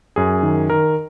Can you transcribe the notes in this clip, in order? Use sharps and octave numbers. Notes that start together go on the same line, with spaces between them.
F#2 G#4
D#3
D#3 A#4